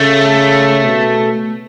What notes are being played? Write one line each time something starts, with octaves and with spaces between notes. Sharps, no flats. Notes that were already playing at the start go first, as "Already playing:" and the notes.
Already playing: C#3 A3
B2